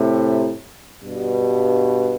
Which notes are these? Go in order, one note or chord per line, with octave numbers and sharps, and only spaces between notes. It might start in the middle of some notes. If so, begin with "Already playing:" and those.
Already playing: A2 C3
G2 B2